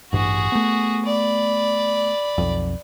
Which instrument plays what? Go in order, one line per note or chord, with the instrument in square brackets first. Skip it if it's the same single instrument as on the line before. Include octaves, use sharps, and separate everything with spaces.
[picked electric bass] A1 G2 [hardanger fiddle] F#4 G#4
[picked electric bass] A3 B3
[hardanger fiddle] D5 B5
[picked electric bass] B1 F2